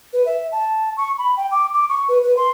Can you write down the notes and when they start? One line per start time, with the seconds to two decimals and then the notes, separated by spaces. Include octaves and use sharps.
0.13 B4
0.26 E5
0.52 A5
0.97 C#6
1.18 B5
1.37 G5
1.52 D6
1.74 D6
1.89 C#6
2.09 B4
2.24 B4
2.37 C6